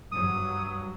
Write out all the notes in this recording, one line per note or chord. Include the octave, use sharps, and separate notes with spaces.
G2 F#3 D#6